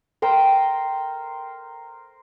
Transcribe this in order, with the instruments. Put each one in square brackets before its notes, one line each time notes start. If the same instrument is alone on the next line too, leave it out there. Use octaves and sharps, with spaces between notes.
[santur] A#4 C5 G5